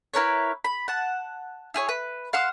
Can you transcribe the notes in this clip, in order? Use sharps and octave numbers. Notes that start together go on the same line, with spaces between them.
E4 A#4 B4 C#5
B5
F#5 A5
E4 G#4 C#5
B4
F5 F#5 C6 E6